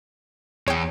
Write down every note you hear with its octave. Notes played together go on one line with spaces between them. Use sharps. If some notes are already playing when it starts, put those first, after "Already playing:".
E2 C#5 G5